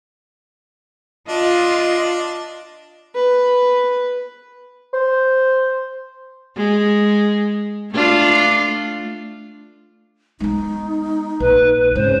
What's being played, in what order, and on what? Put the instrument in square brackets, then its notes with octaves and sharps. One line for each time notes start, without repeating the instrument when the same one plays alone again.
[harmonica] D4 [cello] F4 [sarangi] D#5
[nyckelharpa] B4
[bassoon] C5
[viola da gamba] G#3
A3 D4 F4
[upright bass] G#3 B3 [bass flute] D#4
[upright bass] A#1 [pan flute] B4
[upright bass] G#2 C4 [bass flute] C#3 [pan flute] C5